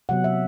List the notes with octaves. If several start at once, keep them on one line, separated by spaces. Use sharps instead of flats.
C3 F#3 B3 F#5
E5